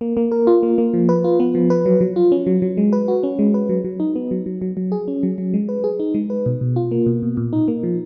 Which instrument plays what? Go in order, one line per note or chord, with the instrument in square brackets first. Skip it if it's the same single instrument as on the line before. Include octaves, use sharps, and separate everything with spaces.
[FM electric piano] A#3
A#3
A#4
F4
A#3
A#3
F3
B4
F4
B3
F3
B4
F#3
F#3
F4
C#4
F#3
F#3
G#3
B4
F#4
C#4
G#3
B4
F#3
F#3
D#4
B3
F#3
F#3
F#3
F#3
G#4
C#4
F#3
F#3
G#3
B4
G#4
D#4
G#3
B4
B2
B2
F4
A#3
B2
B2
A#2
D#4
A#3
F3